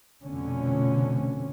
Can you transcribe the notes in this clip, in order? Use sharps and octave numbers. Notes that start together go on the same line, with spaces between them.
F1 F2 B2 D3 C#4